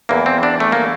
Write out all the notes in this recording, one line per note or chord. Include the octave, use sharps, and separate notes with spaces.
E2 E3 A#3
C4
D4
A3
A#3